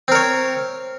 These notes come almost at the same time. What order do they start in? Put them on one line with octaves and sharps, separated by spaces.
C4 A#4 C#5